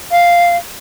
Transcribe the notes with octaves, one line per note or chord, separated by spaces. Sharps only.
F5